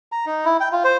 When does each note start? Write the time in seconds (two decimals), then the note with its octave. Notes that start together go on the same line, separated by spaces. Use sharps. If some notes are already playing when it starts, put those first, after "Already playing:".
0.12 A#5
0.26 D#4
0.45 E4
0.61 G5
0.72 F4
0.84 C5